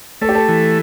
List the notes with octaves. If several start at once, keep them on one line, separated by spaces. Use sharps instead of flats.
A3 A4
G4
A4
E3